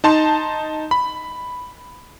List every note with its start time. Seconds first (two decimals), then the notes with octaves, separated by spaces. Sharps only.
0.04 D#4 A5 C6
0.91 B5